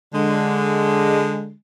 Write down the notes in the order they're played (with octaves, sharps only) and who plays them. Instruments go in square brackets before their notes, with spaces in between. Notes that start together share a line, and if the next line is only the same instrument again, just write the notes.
[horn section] D3 G#3